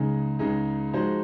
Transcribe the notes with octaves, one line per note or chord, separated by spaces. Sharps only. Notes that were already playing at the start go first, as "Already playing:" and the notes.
Already playing: C#2 C#3 G#3 D#4 G#4
C#2 C#3 G#3 D#4 G#4
F3 G#3 D#4 F#4 C5